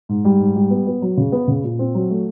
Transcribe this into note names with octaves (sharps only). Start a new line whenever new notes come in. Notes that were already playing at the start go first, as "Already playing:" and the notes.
G#2
G3
G#2
G3
B3
B3
F#3
C#3
B3
C#3
A#2
C4
F#3
A3